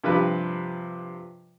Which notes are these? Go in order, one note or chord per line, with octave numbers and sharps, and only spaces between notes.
G2 C3 F3 B4